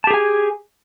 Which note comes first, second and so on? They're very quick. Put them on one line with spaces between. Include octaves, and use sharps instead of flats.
A5 G4 G#4 G#5